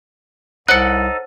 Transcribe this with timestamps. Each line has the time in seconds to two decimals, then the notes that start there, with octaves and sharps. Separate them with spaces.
0.68 C2 D#4 A4 C5 C#5 F#5 F#6 C#7